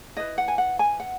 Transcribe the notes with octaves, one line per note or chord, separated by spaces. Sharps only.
E4 B4 D#5
F#5
G#5
F#5
G#5
F#5